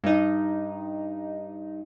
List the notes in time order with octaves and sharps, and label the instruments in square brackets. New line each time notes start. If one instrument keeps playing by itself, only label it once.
[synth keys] G2 D#4